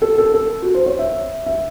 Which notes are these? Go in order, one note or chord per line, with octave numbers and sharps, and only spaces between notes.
A4
A4
A4
F#4
C5
C#5
E5
E5